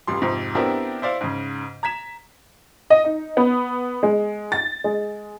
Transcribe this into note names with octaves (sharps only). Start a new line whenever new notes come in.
F1 C#2 G3 C6
F2 G#2 C3
B3 C4 D4 E4 G4 A#4
E4 C5 D5 F5
G#2 C#3
A#5 G#6 B6 E7
D#5
D#4
B3
G#3
A6
G#3